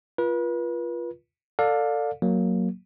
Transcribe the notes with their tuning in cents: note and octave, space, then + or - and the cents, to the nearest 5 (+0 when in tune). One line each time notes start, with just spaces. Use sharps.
F4 -15 B4 -35
A4 +25 D5 +5 F5 +30
F#3 +0 A#3 +0